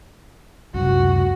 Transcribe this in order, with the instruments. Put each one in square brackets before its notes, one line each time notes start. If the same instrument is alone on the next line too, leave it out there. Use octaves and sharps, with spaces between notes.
[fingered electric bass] C#2 F#2 C3 [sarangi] F#4